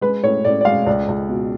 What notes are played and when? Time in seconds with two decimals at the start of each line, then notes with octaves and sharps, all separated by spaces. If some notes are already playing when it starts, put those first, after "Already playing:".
0.01 G#3 B4
0.23 A2 C#5
0.45 A2 D5
0.61 D5
0.65 G#3 F5
0.86 C#2 D5
1.08 C#2
1.29 B2